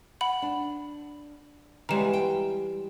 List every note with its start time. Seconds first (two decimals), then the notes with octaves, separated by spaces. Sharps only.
0.21 F#5 B5 F#7
0.42 D4
1.89 C#3 E3 G3 G#3 B3 G4 A#5 E7
2.13 G5